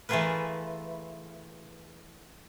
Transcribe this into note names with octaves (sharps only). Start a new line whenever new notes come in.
E3 A3 F4 G#4 A#4 B4